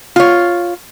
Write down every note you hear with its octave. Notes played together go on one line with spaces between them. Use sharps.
F4 C#5